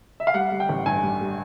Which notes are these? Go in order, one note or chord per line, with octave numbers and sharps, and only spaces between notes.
E5
F5
G3 F#5
G3
G5
A1
G2 G#5
G3
G3